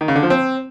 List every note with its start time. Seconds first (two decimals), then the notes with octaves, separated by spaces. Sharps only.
0.01 D#3
0.08 C#3
0.16 D3
0.23 F3
0.30 C4